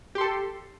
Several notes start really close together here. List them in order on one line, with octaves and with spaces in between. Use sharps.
G4 C6 A4